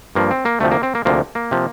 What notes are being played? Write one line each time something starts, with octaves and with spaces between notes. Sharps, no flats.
G2 F3 A#3
C4
A#3
D2 C3 F3 A3
A#3
C4
A#3
D2 C3 F3 A#3
A#3
C3 F3